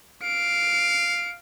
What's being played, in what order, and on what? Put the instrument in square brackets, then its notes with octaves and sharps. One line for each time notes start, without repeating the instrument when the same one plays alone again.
[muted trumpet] F5 [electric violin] D7